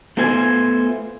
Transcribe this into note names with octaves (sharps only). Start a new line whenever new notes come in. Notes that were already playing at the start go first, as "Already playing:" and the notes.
A3 B3 F4 C5 G#5